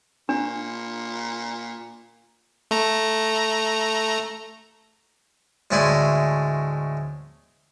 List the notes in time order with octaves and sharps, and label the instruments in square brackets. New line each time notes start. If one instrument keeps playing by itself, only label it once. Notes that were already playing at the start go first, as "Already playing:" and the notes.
[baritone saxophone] A#2 [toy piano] D4
[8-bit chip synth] A3 A#5
[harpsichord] D2 A2 G#3 E4 D5 G#5